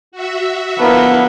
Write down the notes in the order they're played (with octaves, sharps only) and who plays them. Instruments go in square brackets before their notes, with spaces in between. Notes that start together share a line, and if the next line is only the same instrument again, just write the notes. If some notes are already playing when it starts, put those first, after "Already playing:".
[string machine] F#4 E5
[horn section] D3 F3 B3 [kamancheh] A#3 E4